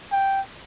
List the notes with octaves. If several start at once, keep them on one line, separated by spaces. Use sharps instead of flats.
G5